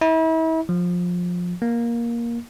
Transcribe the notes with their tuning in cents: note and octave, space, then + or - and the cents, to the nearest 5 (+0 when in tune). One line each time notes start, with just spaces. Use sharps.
E4 -40
F3 +20
A#3 +10